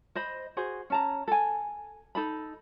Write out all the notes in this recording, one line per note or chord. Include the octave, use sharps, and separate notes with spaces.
C5 D#5 B5
F#4 G#4 C5
C#4 A5 A#5
A4 G#5
D#4 A4 B5